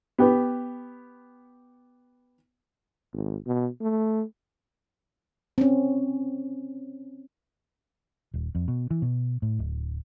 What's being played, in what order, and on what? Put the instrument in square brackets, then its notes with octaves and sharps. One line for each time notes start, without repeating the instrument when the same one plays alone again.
[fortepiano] B3 G4 B4
[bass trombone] G#1
B2
A3
[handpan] C4 C#4
[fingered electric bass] D#1
F2
B2
E3
B2
A2
D1